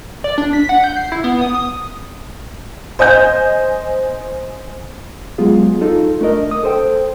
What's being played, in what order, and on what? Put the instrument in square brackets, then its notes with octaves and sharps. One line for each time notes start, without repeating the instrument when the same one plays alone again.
[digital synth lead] D5
D4
B6
F#5
G6
C7
E4
B3
D#6
D#6
[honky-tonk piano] C5 D#5 G#5 G6
[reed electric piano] F#3 G#3 B3 F4 G#4
D#4 F4 A4
A3 D4 A#4 D#5
D#6
A4 C5 G5